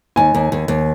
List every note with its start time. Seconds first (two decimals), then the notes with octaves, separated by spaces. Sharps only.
0.16 D#2 G#5
0.35 D#2
0.52 D#2
0.68 D#2